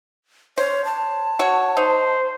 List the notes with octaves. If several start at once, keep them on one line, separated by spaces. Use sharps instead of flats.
C5 C#5
A5
F#4 C#5
D#4 C5